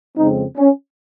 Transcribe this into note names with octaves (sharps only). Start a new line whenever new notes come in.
F2 C#3 G#3 C4 D#4
C#4